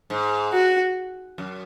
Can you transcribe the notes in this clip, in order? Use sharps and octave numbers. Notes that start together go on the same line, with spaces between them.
G#2
F#4
F#2